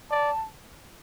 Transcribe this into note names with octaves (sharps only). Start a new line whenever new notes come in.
D5 A5